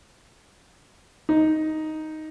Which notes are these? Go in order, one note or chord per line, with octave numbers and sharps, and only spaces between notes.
D#4